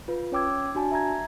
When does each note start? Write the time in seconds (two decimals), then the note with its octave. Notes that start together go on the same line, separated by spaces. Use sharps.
0.08 F4 B4
0.32 C#4 C#5 G5 D6 E6 G#6
0.75 D4 F#4 G#5 A5
0.92 E5 A#5 G#6